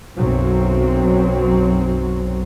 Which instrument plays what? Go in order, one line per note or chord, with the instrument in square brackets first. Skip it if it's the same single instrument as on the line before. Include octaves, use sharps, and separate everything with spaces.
[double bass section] B1 F#2 F#3 C4